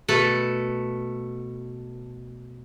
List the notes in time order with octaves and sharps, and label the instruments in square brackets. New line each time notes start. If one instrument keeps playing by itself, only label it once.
[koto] B2 A3 A4 B4